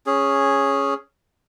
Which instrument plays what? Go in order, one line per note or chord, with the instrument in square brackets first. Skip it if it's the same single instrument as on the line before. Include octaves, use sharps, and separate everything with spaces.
[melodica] C#4 G#4